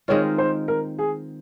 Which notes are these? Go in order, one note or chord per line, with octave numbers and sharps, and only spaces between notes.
D#3 G#3 C4 F4 C#5
C5
A#4
G#4